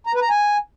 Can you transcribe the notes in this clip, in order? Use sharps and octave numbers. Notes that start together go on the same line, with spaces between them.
A#5
B4
A#5
G#5